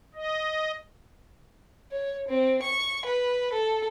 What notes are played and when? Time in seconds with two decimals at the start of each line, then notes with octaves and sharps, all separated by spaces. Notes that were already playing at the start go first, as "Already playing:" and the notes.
0.15 D#5
1.92 C#5
2.28 C4
2.63 C#6
3.05 B4
3.53 A4